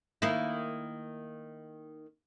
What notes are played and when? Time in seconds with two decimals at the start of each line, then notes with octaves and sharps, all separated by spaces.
0.22 D#3 A#3 E4